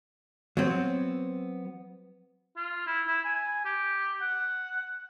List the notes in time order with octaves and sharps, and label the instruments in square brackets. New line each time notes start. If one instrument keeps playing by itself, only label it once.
[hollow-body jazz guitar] F#3 B3 C4
[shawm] F4
E4
E4
G#5
G4
F#5